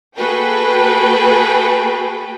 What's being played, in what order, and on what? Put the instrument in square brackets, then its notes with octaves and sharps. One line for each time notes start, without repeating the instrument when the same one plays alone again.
[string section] A#3 F#4 G#4 A4 B4 G5